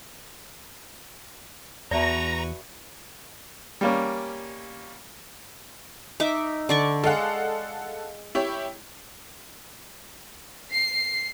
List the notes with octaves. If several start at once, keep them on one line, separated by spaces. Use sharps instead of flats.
E2 F#4 B4 D5 E5 A5 A#5 C#6
G3 A#3 C#4
D#4 E5 D6
D3 D5 C#6
G#3 A4 F5 F#5
E4 G4 C#5
C7